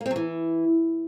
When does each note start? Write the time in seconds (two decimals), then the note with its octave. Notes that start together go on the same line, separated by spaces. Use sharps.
0.01 A#3
0.06 C4
0.11 F#3
0.16 E3